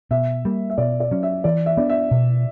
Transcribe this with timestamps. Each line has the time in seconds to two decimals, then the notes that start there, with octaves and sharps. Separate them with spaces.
0.11 B2 E5
0.45 G3 A#3
0.70 E5
0.78 B2 D5
1.00 D5
1.11 F#3 C#4
1.23 E5
1.44 E3 D5
1.66 E5
1.77 B3 D4 D5
1.90 E5
2.11 B2